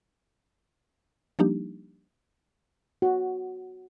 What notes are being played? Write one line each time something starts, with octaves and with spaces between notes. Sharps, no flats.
F3 G3 A#3 D4 D#4 G4
F#4